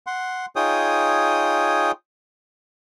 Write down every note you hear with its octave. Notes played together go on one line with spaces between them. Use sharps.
F#5 C6
D#4 F4 G#4 C#5 G5 D#6